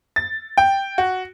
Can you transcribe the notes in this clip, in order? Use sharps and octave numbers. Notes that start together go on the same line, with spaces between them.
A6
G5
F#4